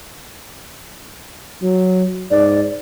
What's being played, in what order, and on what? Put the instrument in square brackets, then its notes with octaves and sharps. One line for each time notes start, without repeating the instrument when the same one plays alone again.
[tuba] F#3
[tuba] G#2 [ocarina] D5